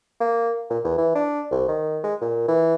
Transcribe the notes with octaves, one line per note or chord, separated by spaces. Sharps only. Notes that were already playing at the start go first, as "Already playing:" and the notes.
A#3
A#2
E2
E3
D4
C2
D#3
G#3
A#2
E3